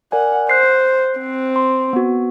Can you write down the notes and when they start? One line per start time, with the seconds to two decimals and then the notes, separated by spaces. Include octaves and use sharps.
0.12 A#4 D5 F#5 G#5
0.49 C5 F#6 C7
1.20 C4
1.56 C6
1.93 B3 F#4